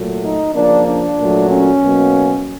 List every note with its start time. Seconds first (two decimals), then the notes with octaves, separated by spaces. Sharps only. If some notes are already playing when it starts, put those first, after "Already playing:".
Already playing: A#2 F#3 A3
0.22 D#4
0.53 C#3 F3 A#3 D4
0.86 D4
1.18 A#2 F#3 A3
1.50 C#4
1.82 B2 F#3 A#3